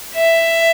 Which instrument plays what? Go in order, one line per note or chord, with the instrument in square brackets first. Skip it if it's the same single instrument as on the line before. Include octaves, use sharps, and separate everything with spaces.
[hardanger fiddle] E5